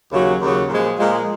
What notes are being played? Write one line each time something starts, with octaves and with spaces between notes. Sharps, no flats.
D#2 C#3 F#3
D#2 C#3 F#3
A#2 F3 G#3
A#2 F3 G#3